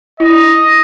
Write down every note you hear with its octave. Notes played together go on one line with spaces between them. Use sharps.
E4 D#5